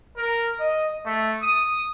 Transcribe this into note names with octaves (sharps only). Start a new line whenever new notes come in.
A#4
D#5
A3
D#6